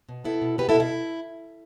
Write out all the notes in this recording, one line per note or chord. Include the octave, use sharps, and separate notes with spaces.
B2
B3 E4 A4
B2
B3 G4 B4
E4 A4
B2
E4